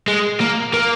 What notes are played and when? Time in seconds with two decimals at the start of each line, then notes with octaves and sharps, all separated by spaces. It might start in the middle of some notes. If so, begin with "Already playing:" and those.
0.08 G#3
0.40 A#3
0.74 A#3